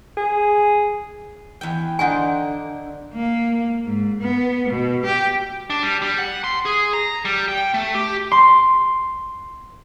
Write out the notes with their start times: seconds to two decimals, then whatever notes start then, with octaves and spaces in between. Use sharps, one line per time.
0.17 G#4
1.61 E2 G5
1.99 D3 D#4 C5 F#5 G#5
3.13 A#3
3.84 G#2
4.19 B3
4.67 B2
5.04 G4
5.70 D4
5.83 G3
6.02 G3
6.18 F#5
6.44 C6
6.66 G#4
6.93 A#5
7.25 G3
7.48 G5
7.74 A3
7.95 G4
8.32 C6